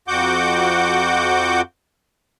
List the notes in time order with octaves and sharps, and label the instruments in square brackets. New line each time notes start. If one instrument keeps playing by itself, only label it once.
[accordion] F2 F#4 F#5 D6 G6